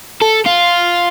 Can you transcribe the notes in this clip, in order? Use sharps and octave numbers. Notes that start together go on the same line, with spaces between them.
A4
F4